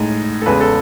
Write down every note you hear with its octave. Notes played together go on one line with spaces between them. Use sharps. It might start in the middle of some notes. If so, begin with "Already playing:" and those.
Already playing: A2 G#3 D#4
A4
E2 C#3 G#3 B4
A4